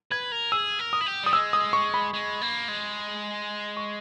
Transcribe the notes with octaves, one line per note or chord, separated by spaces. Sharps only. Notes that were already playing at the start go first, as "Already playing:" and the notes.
B4 G#6
A#4
G#4 E6
A#4
D#6
E4
G4
G3 D#6
G#3 E6
D#6
C#6
B5
G#3
A#3
G#3
C#6